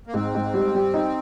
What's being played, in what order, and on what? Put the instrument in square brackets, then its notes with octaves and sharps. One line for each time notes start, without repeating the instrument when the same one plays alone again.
[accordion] A#3
[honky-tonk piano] G#2 [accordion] C4
[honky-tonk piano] G#2
G3
G3
D#4